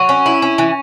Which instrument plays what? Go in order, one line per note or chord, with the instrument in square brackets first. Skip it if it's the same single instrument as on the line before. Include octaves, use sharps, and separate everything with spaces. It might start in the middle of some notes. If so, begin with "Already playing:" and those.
Already playing: [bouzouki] F#3 [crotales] C#6
[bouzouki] C#4
E4
C#4
E3